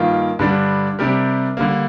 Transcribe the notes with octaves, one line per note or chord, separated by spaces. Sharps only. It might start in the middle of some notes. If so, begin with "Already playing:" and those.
Already playing: G2 D#3 A#3 F4
G2 D3 G3 D4
C3 G3 D4 G4 A#4
D3 G3 A#3